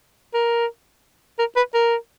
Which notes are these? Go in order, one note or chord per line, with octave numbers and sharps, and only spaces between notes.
A#4
A#4
B4
A#4